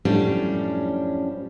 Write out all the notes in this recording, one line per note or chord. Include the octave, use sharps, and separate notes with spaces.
F#2 A2 F3 G3 C#4 D4